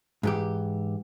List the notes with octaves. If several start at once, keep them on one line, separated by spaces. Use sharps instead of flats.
G#2 E3 G4